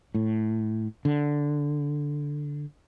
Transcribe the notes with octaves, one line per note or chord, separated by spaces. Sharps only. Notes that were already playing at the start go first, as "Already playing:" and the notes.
A2
D3